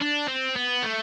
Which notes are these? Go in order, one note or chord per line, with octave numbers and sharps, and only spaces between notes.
D4
C4
B3
A3